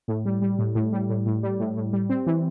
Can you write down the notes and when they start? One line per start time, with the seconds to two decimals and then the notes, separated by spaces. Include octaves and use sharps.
0.08 A2
0.26 G3
0.42 G3
0.59 A2
0.75 A2
0.93 G3
1.09 A2
1.26 A2
1.43 G3
1.60 A2
1.76 A2
1.93 G3
2.09 C4
2.27 E3